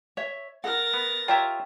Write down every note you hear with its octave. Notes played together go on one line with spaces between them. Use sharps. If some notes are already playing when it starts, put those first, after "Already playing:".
C#5 E5
A#4 F#5 A6 A#6
B3
F4 G4 C#5 E5 G5 A#5